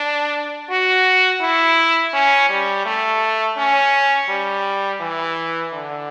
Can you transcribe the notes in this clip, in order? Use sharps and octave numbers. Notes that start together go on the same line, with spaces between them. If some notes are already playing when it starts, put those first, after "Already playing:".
Already playing: D4
F#4
E4
C#4
G3
A3
C#4
G3
E3
D3